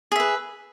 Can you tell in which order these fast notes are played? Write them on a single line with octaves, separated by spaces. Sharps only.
G#4 E5 B4